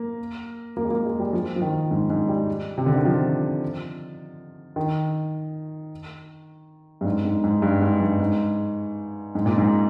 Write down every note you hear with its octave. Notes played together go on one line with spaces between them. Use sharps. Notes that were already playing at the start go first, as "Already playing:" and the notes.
Already playing: A#3
A#3
G#3
A#3
G#3
G3
F3
F3
D#3
G#2
G#2
G3
C3
D3
D#3
F3
D#3
G2
G#2
G#2
G#2
G2
G#2
G2
G#2
G#2
A#2
G#2